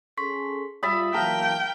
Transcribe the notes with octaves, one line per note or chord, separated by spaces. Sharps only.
C#4 G#4 A4 C6 C#6 B6
G3 F4 E5 B5 D#6 A6
E3 F#3 A#3 A#4 F5 G5 A5